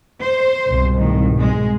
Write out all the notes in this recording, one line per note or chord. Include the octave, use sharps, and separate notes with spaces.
C5
C2 G#2 B2
A2 D#3
G#3